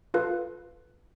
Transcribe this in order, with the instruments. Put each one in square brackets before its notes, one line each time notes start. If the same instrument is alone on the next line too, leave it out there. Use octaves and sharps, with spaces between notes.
[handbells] F4 A4 B4 F5